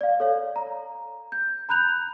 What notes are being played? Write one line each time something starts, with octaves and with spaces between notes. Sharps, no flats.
D5 F5
A4 C#5 F5
A#5
G6
A#5 B5 F#6 G6 F7